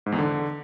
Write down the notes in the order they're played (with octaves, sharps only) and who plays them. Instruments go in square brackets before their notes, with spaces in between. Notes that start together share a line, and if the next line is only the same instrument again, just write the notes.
[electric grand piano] G#2
E2
D3